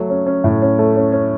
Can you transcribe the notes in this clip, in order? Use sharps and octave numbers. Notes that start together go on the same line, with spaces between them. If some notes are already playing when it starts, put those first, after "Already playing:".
Already playing: F#3 A3
C#4
C#4
A2
C#4
A3
C#4
C#4